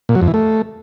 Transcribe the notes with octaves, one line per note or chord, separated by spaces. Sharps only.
A#2
F#3
F2
E3
A3